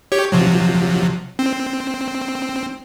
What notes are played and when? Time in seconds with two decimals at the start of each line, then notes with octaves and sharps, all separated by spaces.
0.12 G4 C#5
0.32 C3 F3 F#3
1.39 C4